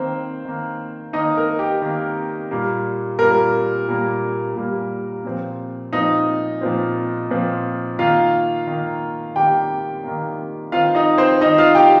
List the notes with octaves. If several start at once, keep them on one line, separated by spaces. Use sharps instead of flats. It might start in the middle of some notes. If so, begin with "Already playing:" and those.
Already playing: D#3 A#3 C4 C5
D#3 A#3
D#3 A#3 D#4 D#5
A#4
G4
D#3 A#3
A#2 G3 A#3
A#2 G3 A#3 A#4
A#2 G3 A#3
A#2 G3 A#3
A#2 F3 C4
A#2 F3 C4 D#4 D#5
A#2 F3 C4
A#2 F3 C4
D#3 A#3 F4 F5
D#3 A#3
D#3 A#3 G4 G5
D#3 A#3
D#3 C4 F4 F5
D#4 D#5
C4 C5
D#3 C4 D#4 D#5
F4 F5
G4 G5